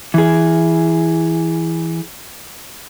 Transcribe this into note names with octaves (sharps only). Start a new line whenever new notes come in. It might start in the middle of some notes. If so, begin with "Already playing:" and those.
E3 G#4